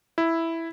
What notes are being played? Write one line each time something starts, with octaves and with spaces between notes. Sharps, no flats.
E4